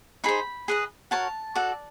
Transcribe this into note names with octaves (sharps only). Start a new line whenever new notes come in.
D#4 G#4 C5 B5
G#4 B4 D#5
F#4 A#4 C#5 A5
F#4 A4 D5